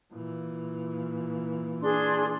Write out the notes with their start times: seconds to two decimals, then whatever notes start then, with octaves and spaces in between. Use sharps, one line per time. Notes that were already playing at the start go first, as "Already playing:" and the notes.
0.12 A#2 E3
1.82 D4 G#4 C6